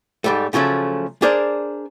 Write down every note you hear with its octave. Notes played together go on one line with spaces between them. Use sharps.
G#2 G3 A3
C#3 F3 F#3 A3 C#4
D4 G#4 A#4 C5 D5